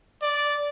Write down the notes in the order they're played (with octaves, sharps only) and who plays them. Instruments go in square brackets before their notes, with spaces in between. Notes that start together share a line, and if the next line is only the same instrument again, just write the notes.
[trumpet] D5